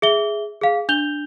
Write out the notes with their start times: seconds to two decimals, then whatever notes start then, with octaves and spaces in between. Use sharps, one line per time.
0.02 G#4 E5 G7
0.61 G#4 F5
0.89 D4 G6 F7 G7